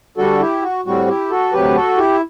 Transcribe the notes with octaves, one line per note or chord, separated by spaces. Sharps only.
D3 G3 D4 F#4 A4
E4 G4
F#4
A2 G3 C4 F#4
E4 G4
F#4 A4
D2 C3 F#3 G4 B4
F#4 A4
E4 G4